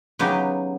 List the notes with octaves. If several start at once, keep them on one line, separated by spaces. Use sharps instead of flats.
C#3 F#3 B3 D#4 G4